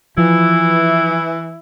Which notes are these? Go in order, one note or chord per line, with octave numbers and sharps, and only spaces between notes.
E3 F3 E4